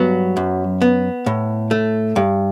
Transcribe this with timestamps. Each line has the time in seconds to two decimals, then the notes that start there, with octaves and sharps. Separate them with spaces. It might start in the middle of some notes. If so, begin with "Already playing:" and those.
Already playing: G2 F#3 B3
0.37 F#2
0.82 B3
1.26 A2
1.71 A3
2.16 G2